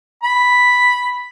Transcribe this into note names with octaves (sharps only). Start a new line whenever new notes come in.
B5